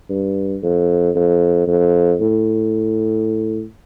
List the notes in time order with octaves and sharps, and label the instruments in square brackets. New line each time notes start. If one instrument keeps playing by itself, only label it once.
[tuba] G2
F2
F2
F2
A2